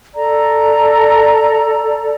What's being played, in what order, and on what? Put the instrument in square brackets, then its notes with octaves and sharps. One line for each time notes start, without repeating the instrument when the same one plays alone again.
[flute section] A4 D5 A#5